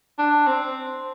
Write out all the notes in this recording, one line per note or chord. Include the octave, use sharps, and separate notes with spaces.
D4
C4